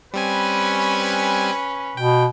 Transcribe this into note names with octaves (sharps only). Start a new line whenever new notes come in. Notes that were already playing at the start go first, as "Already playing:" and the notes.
G3 C4 C#4 B4 G#5
B2 G5